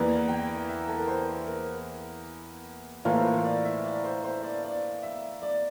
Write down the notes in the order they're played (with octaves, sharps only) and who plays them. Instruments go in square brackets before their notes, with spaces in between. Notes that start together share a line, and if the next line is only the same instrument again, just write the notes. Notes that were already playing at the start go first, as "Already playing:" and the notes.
Already playing: [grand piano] E2 E3 A#3 [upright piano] D5
[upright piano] A#5
G5
E5
A4
A#4
C5
A#4
[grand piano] A2 E3 A#3 F4 [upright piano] A4
[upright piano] C5
A#4
D5
E5
D5
C5
C5
D5
D5
E5
D5